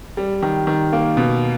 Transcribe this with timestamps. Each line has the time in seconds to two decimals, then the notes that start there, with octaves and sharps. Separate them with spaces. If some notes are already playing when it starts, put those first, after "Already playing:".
0.17 G3
0.43 D#3
0.67 D#3
0.92 A#3
1.17 B2